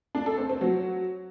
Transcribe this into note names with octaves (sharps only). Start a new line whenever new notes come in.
D4
A4
C4
C4
F#3